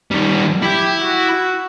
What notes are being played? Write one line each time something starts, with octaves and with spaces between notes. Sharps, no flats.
D#3 G3
E4 G4
F#4